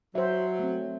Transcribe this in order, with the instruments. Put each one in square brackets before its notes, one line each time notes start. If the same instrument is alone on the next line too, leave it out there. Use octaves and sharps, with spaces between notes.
[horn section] F#3 [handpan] C5 E5
[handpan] A3 C4